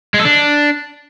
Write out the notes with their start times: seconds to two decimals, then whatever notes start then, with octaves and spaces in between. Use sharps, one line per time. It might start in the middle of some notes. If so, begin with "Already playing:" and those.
0.14 G#3
0.20 A4
0.25 D4